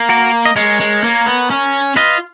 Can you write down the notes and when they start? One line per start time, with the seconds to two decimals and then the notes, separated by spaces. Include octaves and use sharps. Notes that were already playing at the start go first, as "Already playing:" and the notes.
Already playing: A#3
0.09 F#4 A#4
0.45 D#5
0.56 G#3 A#4 C#5
0.80 G#3
1.04 A#3
1.26 B3
1.50 C#4
1.96 F4 B4 D#5